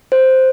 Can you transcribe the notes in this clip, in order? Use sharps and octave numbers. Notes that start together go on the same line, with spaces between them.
C5